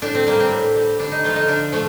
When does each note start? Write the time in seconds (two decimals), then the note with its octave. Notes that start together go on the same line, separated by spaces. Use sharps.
0.02 A2 D4
0.15 C4
0.27 G3 A#3
0.40 C4
0.51 A2
0.76 G3
0.99 D3 D4
1.12 D#4
1.24 F3 A3 F4
1.36 D#4
1.48 D3 D4
1.72 F3 A3